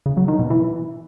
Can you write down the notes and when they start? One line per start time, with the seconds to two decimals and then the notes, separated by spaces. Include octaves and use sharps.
0.06 C#3
0.17 F#3
0.28 D#3
0.39 B2
0.50 E3